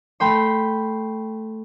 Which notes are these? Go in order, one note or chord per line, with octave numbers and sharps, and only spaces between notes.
A3 G5 B5 C6